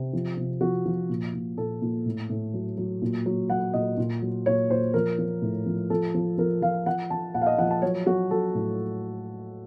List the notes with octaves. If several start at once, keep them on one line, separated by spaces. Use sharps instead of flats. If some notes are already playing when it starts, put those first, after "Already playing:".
Already playing: C3
F3
C3
F3 F#4
F3
A#2
A#2
A#2 A4
A#2
A2
A2
F#3
F#3
A#2
F#3
F#3 F#5
A#2 D#5
A#2
F#3
A#2 C#5
A#2 C5
F3 A#4
F3
A2
F3
F3 A4
F3
F3 A#4
F3 F5
F3 F#5
F3 A5
A#2 F#5
F5
D#5
F3 F#5
A5
F#3 C#5
F#3 F#4
F#3 A4
A2